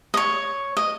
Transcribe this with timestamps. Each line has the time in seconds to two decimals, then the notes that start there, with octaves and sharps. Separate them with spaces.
0.14 D#5
0.17 C#5
0.77 D#5